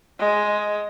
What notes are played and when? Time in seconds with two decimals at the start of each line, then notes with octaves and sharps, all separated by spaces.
0.19 G#3